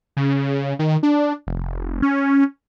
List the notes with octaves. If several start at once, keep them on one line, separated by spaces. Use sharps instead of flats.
C#3
D#3
D4
F1
C#4